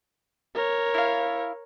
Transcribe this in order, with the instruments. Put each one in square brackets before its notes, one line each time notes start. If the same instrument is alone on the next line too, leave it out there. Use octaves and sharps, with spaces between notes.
[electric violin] A#4 C#5
[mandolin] E4 F5